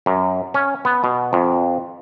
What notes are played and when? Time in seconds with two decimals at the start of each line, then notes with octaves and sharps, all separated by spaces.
0.06 F#2
0.54 C#4
0.85 B3
1.04 B2
1.33 F2